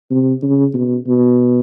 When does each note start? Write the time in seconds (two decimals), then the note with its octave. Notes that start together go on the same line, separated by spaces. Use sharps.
0.11 C3
0.43 C#3
0.74 B2
1.07 B2